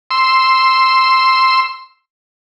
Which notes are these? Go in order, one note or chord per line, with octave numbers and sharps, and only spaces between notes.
C6 E6